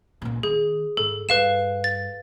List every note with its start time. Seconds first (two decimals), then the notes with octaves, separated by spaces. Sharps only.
0.22 C#2 A#2
0.43 D#3 G#4
0.97 G#2 A4
1.29 G2 B4 F5 E7
1.84 A6